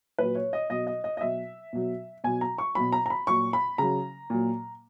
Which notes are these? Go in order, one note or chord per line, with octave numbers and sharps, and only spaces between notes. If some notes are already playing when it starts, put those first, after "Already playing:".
A#2 F#3 B4
C#5
D#5
B2 F#3 D#5
D#5
D#5
D#5
B2 F#3 E5
B2 F#3
B2 F#3 G#5
A#5
C#6
B2 F#3 B5
A#5
A#5
B5
A#2 F#3 C#6
B5
C#3 F#3 A#5
A#2 F#3